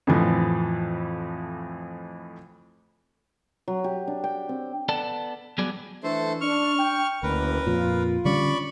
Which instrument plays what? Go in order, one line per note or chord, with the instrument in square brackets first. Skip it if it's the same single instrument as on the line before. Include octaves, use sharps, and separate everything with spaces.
[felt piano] F2 A2 E3 F3
[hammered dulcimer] F#3
G4
D4
G5
C4
[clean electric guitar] B3 A4 D5 A5
F#3 G3 B3 F#4 G#4 D5
[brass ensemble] E3 D4 [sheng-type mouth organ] A3 A4 C5
[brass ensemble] D4 [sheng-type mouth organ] C#6 F6
[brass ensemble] G5
[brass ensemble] F#1 [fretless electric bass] D2 [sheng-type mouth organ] A#4 B4
[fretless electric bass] F2 A#2 [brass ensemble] F4
[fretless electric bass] D3 G3 C#4 [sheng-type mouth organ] D5 B5 C#6